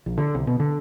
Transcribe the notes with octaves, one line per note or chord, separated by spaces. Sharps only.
A#1
D3
C2
B2
D3